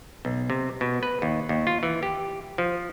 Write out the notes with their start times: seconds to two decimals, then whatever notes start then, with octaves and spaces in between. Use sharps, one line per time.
0.25 B1
0.50 C3
0.81 B2
1.03 B4
1.22 D#2
1.49 D#2
1.67 F4
1.83 E3
2.03 G4
2.58 F3